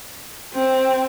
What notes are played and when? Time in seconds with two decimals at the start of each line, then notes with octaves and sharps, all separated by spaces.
0.54 C4